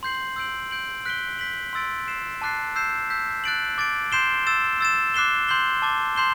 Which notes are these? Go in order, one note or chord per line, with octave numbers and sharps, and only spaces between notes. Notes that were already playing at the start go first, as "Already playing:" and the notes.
C6 G6 C7 F#7
E6 G6 D7 F#7
G6 D7 F#7
F#6 B6 D7 G7
G6 B6 F#7
C6 E6 A6 D7
F#6 C7 E7
A5 D6 F#6 A6 C7
E6 G6 C7 E7
E6 G6 B6
F#6 A6 D7 F#7
D6 A6 D7
C6 G6 C7 E7 G7
E6 A6 E7
E6 A6 E7
D6 F#6 C7 E7 G7
C6 G6 C7 G7
A5 D6 A6
C6 G6 C7 E7 G7